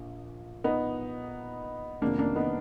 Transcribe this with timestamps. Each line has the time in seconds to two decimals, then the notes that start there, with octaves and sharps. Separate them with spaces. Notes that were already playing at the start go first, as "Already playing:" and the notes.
Already playing: A#1 A#2
0.64 B3 D#4
2.01 F1 F2 D#3 G#3 A#3 D4
2.19 A#3 D4
2.36 B3 D#4